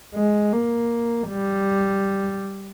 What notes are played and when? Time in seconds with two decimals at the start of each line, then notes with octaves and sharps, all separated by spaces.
0.15 G#3
0.52 A#3
1.29 G3